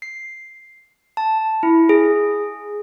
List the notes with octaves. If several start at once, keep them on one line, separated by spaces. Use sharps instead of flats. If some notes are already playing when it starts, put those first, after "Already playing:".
C7
A5
E4
G#4